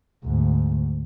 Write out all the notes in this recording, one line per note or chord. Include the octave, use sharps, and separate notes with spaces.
D2 G#2